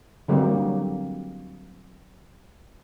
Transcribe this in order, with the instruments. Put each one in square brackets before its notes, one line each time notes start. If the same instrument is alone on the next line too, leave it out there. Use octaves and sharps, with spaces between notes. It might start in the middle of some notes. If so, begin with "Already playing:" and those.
[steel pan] D3 F#3 G3 A#3 C4 G4